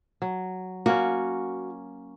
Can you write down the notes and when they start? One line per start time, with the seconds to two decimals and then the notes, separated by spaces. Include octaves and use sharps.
0.22 F#3
0.86 A#3 C#4 F#4